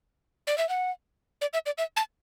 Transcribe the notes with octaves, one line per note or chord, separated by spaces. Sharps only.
D5
E5
F#5
D5
E5
D5
E5
A5